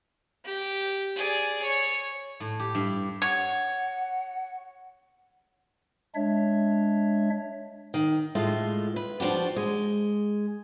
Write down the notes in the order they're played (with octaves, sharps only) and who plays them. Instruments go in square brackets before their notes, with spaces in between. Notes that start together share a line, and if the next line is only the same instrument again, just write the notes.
[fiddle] G4
G#4 D5
C#5
[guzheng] A2
G4
G2
[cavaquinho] C#5 [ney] F#5
[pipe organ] G#3 D4 C#5 E5
[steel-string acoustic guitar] D#3
A2 G#3 A3 F4
B4
F3 D4 F#4 G4
G#3